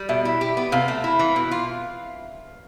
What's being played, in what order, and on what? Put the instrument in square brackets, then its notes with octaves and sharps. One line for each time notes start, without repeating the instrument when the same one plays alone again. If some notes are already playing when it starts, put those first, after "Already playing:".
Already playing: [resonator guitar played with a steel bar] G3
[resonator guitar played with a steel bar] B2 [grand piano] E5
[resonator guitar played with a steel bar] E4
G4
B3
[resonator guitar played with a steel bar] C3 [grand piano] F5
[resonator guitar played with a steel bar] A3
E4
E3
B2
F4